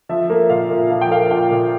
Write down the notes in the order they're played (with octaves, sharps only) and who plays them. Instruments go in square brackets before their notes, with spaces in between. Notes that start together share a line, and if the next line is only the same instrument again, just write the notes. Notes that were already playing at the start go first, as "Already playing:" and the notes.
[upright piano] F3 E5
A#3
A#2 F5
A#2
F3 F5
G5
A#3 F5
A#2 G5
A#2